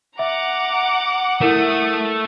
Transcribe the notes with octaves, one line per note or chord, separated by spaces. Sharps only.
E5 F#5 A#5 D6
A3 E4 A#4 D#6